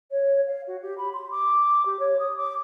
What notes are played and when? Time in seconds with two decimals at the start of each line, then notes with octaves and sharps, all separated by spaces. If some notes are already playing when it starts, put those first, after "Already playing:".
0.11 C#5
0.46 F5
0.67 F#4
0.82 G4
0.97 B5
1.13 C6
1.31 D6
1.85 G4
1.99 C#5
2.19 D#6
2.37 D6